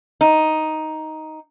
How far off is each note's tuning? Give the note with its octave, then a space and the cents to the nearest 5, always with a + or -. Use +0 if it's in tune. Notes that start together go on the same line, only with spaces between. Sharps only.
D#4 +5